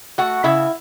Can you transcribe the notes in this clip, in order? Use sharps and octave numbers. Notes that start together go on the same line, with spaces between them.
A3 F#4 F#5
C#3 E4 E5